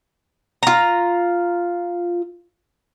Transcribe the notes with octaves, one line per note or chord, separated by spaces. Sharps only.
F4 A#5